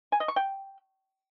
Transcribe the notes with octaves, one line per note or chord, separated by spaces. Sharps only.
G#5
D#5
C#6
G5